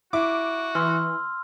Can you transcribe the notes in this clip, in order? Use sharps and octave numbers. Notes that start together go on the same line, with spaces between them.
E4 F#4 D6
E3 C6 E6 F6